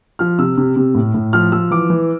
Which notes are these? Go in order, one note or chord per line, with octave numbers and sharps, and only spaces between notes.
F3 F6
C3 E6
C3
C3
A2
A2
F3 F6
F3 E6
E3 D6
E3